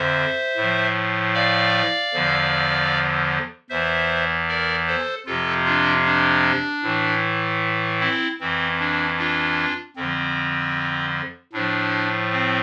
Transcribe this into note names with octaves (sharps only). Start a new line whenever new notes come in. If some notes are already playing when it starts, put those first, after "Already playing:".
Already playing: F2 D3 C5 E5
A2 F3
D5 F5
E2 D3 F3
E2 E3 C5 E5
A#4 D5
A4 C5
F2 C3 F3 F4 A4
D4 F4
D4
A2 E3
C4 E4
F2 E3 C4
D4
D4 F4
F2 D3 F3 C4
A2 F3 D4
C4